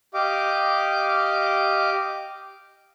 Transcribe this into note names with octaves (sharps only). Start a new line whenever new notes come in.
G4 D#5 F5 D6